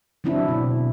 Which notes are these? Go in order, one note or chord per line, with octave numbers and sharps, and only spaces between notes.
D3 F#3 C4 D4 E4
B2